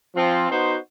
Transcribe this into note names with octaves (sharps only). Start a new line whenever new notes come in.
F3 C4 F4
B3 D#4 F#4 C5